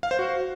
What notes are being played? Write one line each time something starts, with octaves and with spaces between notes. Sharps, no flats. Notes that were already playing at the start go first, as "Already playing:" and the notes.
F5
C5
F#4